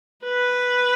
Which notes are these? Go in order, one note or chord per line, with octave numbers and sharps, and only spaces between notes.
B4